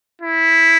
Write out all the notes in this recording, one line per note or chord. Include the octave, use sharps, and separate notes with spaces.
E4